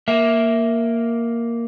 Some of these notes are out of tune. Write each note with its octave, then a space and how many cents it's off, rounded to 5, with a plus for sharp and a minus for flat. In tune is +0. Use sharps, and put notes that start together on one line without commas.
A#3 +0 E5 +0